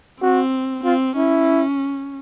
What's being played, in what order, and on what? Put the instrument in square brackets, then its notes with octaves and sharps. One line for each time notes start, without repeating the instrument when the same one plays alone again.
[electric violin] C4 [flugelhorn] F#4
[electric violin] C4 [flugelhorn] F4
[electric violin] C#4 [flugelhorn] E4